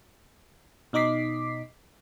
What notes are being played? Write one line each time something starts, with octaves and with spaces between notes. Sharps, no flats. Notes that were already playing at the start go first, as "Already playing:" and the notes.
B2 D#4 D#5 D6 B6 C7